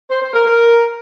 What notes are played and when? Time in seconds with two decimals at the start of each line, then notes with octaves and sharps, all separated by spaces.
0.10 C5
0.21 C5
0.33 A#4
0.45 A#4